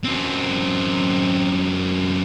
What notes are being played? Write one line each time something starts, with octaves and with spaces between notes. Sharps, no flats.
F#2 C4